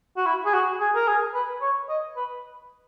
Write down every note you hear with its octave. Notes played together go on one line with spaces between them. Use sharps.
F#4
E4
G#4
F#4
G#4
A#4
G#4
B4
C#5
D#5
B4